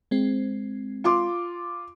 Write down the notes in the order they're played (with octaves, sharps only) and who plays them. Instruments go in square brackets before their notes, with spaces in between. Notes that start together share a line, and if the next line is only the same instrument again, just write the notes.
[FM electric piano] G#3 C4
[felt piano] F4 C6 D6